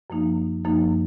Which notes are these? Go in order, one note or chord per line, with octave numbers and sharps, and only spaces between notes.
F#2 F3 A#3 D#4
F#2 F3 A#3 D#4